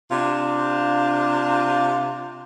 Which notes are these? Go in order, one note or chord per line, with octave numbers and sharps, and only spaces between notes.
C3 D4 F4